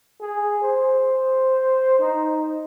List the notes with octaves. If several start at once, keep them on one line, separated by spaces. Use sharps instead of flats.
G#4
C5
D#4